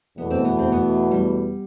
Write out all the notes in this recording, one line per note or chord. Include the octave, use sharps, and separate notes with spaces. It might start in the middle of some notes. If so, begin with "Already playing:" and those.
E2 B2 A3 B3
C4
B3
C4
B3
G3